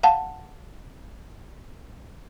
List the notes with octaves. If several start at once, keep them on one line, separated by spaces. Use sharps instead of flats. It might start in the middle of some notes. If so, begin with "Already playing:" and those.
F5 F#5 A5